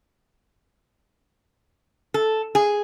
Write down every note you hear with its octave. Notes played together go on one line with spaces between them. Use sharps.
A4
G#4